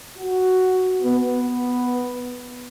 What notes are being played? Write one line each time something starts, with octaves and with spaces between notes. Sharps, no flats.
F#4
B3